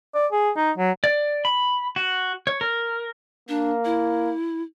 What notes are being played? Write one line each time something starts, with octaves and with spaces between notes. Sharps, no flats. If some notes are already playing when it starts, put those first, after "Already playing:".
D5
G#4
D#4
F#3
D5
B5
F#4
C#5
A#4
A#3 D4
E4